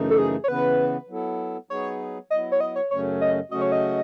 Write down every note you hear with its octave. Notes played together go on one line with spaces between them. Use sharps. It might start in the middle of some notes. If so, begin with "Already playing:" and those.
Already playing: F#2 C#3 E3 A3 D#4
A4
G#4
C#5
C#3 E3 B3 B4
F#3 B3 E4 A4
F#3 B3 D#4 G#4 B4 C#5
F#3 B3 E4 D#5
C#5
D#5
C#5
F#2 C#3 F#3 A3 C#4 C#5
D#5
C#3 F#3 A3 C#4 F#4 D#5
C#5
D#5